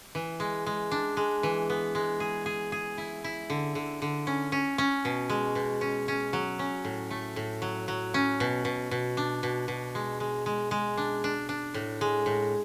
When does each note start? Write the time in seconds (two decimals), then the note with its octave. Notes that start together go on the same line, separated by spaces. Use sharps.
0.15 E3
0.40 G#3
0.66 G#3
0.91 D4
1.17 G#3
1.43 E3
1.70 B3
1.95 G#3
2.20 G#4
2.46 G#4
2.72 G#4
2.98 E4
3.24 E4
3.50 D3
3.75 D3
4.02 D3
4.27 C#4
4.52 C#4
4.78 C#4
5.05 B2
5.30 G#3
5.55 B2
5.81 C#4
6.08 C#4
6.33 F#3
6.59 C#4
6.85 A2
7.11 A3
7.36 A2
7.62 F#3
7.88 F#3
8.14 C#4
8.40 B2
8.65 B2
8.91 B2
9.17 D4
9.43 B2
9.68 B2
9.95 G#3
10.20 G#3
10.46 G#3
10.71 G#3
10.97 D4
11.24 D4
11.49 D4
11.74 A2
12.01 G#3
12.26 A2